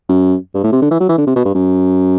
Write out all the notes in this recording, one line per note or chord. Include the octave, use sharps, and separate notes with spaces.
F#2
G2
A2
C3
D3
E3
F#3
E3
D3
C3
B2
G2
F#2